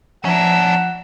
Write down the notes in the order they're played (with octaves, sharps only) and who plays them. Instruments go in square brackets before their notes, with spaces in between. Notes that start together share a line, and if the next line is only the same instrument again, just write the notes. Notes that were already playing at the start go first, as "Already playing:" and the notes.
[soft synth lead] F3 [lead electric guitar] C#4 D4 [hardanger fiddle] E5 A#5 [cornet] F#5